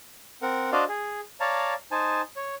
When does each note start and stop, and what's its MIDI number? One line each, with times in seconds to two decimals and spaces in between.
0.42 0.71 60
0.42 0.71 70
0.42 0.71 78
0.72 0.84 62
0.72 0.84 66
0.72 0.84 72
0.72 0.84 74
0.72 0.84 75
0.72 0.84 77
0.89 1.20 68
1.40 1.74 73
1.40 1.74 74
1.40 1.74 77
1.40 1.74 81
1.40 1.74 82
1.91 2.21 63
1.91 2.21 72
1.91 2.21 80
1.91 2.21 81
2.36 2.55 73